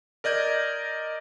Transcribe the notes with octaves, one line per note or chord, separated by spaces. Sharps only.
A#4 D5 D#5 G6 G#6